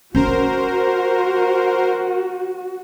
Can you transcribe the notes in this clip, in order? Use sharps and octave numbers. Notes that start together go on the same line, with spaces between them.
C#4 F#4 A#4 C5